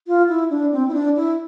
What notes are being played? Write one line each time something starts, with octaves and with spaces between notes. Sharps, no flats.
F4
E4
D4
C4
E4
D4
E4